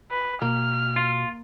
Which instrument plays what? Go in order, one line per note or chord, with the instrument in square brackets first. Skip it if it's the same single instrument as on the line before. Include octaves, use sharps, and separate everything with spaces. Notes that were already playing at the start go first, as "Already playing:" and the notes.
[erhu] B4
[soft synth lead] B2 [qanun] A#3 [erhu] F6
[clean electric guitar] F4